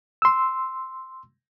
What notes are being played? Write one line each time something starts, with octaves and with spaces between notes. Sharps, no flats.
C6 E6